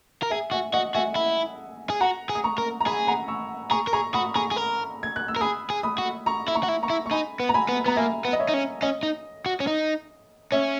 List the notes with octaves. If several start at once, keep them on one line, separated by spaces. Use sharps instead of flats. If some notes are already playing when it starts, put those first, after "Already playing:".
A#4
G#4 E5 G#5
F#4 E5 G#5
F#4 D#5 F#5
F#4 E5 G#5
E4
G#4
F#4 F#5 A#5
G#4
D#6
A#5 C#6
A#4
A#5
G#4 G#5 B5
F#5 A#5
C#6 E6
G#4 A#5 C#6
A#4
G#4 A#5 C#6
F#4 B5 D#6
G#4 A#5 C#6
G#4
A#4
G#6
F#6
E6
A#4
G#4 B5 D#6
G#4
B5 D#6
F#4
A#5 C#6
E4
A#5 C#6
F#4
E4
A#5 C#6
E4
C#6
D#4 G#5 B5
B3
A#5
G#5 B5
B3
B3 A#5
A#3 E5 G#5
B3
D#5
C#5 E5
D#4
C#4
C#4 D#5
D#4
F#4
C#4
D#4
C#4 C#5 E5